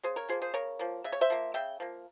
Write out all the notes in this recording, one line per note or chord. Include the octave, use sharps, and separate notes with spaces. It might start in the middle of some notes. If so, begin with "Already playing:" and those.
C#3 G#4 C5
A#4 C#5
F3 A#3 G#4 C5
G#4 C5
C#3 A#4 C#5
F3 A#3
C#3 E5
C#5
C5 E5
F3 A#3
C#3 E5 G5
F3 A#3